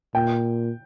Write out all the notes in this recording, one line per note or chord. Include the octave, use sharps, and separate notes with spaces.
A#2 G5